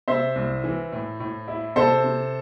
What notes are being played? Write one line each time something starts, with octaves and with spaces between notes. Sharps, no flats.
C3 C5 E5
C2
E3
A2
A2
E4
C3 A4 C5
C3